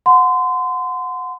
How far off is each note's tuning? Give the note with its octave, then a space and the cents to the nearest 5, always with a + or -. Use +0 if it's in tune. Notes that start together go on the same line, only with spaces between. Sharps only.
F#5 -25 C6 -30